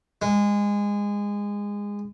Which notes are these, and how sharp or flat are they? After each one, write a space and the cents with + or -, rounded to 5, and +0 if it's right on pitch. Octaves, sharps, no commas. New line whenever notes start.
G#3 -20